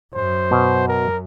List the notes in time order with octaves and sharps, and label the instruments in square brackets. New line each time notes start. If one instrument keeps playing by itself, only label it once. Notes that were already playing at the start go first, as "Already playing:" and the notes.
[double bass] F#2 [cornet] C5
[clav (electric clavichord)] B2
[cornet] A#4